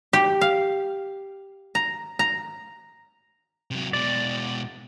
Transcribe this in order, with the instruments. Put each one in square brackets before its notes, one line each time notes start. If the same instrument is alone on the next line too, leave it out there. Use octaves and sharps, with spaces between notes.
[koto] G4
F5
A#5
A#5
[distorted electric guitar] C3 F#3
[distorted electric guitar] B2 G#3 [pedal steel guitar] D5